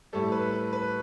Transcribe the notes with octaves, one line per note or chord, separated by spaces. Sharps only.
A2 G3 A4
B4
B4
B4